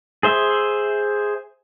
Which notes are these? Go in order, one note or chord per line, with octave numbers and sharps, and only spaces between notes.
G#4 C5 E5